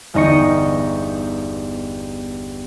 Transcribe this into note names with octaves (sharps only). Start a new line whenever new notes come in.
G1 E2 D#4 D#5 C#6 C#7